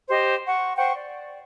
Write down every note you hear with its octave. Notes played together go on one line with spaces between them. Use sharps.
G4 C5 D#5
F#5 C#6
C5 F#5 G5 C#6
D5